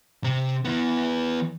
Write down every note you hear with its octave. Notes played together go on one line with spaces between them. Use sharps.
C3 C4
E3 B3